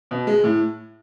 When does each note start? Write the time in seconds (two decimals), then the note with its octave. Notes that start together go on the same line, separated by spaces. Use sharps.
0.11 B2
0.27 G#3
0.44 A2